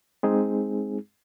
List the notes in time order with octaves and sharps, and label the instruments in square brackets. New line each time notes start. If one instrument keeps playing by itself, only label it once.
[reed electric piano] G#3 C4 D#4 G#4